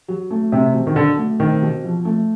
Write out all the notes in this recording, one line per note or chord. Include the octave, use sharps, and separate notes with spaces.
F#3
A3
C3 C4
B2
D#3
D3 F#3
A3
D#3 C4
B2
F3
A3